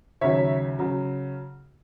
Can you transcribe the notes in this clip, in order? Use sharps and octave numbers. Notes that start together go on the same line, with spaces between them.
D#2 C#3 F#3 C#5 E5
C#3 F#3